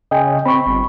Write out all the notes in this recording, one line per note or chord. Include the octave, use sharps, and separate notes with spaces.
C#3 D#5 G5 G#5
C4 B5 C#6
G1